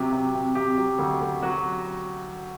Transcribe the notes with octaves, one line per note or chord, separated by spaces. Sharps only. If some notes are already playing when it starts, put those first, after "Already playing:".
Already playing: C3 F#3 G4
C3
C3
C3 G4
F#3
D2
D2
F#3 F#4